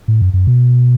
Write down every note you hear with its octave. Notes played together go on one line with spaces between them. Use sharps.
A2
F#2
F#2
B2